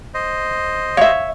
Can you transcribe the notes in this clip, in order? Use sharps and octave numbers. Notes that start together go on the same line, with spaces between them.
C5 D#5
C#5 E5 F5